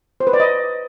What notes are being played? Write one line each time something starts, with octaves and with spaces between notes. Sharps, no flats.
C5
B4
D5
D#5